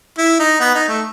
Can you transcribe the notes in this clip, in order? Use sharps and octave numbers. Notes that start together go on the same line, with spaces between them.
E4
D#4
B3
D#4
A3